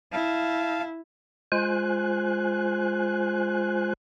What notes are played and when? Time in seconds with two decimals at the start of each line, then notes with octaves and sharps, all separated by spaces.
0.13 E4 F5 A5
1.52 G#3 F4 C5 G#5 F#6